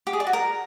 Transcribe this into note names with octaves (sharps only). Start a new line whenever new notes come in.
G4
G#4
D5
F#4
A#4